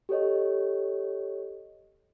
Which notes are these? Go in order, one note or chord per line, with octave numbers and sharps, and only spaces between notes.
G4 A4 C#5 D#5